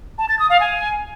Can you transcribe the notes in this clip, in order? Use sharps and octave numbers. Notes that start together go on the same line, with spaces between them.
A5
A6
D#6
F5
G#5